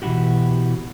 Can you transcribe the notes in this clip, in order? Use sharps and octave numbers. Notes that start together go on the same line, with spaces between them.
B2 E3 F#3 E4 F#4 G4